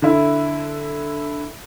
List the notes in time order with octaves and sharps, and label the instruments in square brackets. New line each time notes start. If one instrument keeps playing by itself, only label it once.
[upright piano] D3 E4